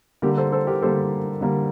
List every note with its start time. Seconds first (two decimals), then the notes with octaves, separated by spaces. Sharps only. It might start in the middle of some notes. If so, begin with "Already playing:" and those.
0.22 D3 G3 A#3 G4 A#4
0.37 A4 C5
0.52 A4 C5
0.67 G4 A#4
0.82 D3 G3 A#3 A4 C5
1.41 D3 G3 A#3